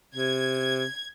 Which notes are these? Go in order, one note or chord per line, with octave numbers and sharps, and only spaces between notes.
C3 G#6